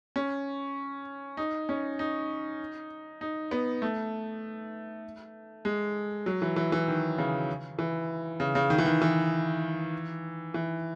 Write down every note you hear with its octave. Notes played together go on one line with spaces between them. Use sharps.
C#4
D#4
C#4
D#4
D#4
B3
A3
G#3
F#3
E3
E3
E3
D#3
C#3
E3
C#3
C#3
D#3
E3
D#3
E3
E3